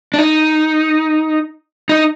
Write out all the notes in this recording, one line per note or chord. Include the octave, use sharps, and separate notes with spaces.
D4
D#4
D#4